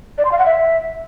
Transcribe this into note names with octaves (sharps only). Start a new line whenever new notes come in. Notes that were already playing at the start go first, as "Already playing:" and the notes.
D5
C6
F5
F#5
E5